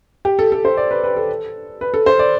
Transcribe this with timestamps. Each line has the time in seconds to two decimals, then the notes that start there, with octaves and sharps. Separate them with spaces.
0.25 G4
0.39 A4
0.52 A4
0.65 C5
0.77 D5
0.91 B4
1.04 B4
1.16 A4
1.81 B4
1.94 A4
2.06 C5
2.19 D5